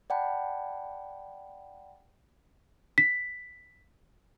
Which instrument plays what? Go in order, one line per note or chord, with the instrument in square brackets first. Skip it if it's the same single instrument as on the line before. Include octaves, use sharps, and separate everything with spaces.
[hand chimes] D5 F#5 G5 A5 B5
[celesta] B6